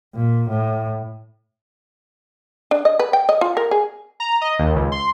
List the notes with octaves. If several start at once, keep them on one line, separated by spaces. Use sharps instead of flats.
A#2
A2
D4
D#5
B4
G5
D#5
F4
A#4
G#4
A#5
D#5
D#2
C#2
C6